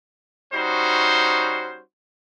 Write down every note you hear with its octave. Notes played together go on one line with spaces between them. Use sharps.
G3 C#4 D#4 F#4 C5